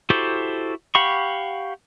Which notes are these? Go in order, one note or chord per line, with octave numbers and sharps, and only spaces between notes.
E4 F#4 G4 A4 C5
G4 F5 F#5 B5 C#6